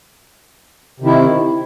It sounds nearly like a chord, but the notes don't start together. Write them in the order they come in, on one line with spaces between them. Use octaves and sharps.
C3 D#3 E4